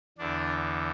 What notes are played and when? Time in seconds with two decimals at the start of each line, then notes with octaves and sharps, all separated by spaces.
0.18 E2 D3 D4